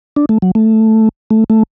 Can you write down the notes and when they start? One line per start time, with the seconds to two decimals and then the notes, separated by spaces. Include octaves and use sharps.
0.16 D4
0.29 A3
0.42 F#3
0.55 A3
1.31 A3
1.50 A3